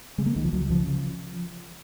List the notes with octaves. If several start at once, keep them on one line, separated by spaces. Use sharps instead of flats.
C#3 G#3
A#3
C#2 D#3
F3
C#2 F#3
C#3 F3
C#3